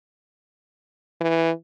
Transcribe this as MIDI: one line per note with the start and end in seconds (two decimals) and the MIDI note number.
1.21 1.51 52